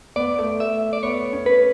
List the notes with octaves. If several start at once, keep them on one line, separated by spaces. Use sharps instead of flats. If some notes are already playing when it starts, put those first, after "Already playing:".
B3 D5
A3
A3 E5
D5
B3 C#5
C#4
B4